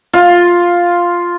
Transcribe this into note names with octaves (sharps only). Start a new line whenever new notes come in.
F4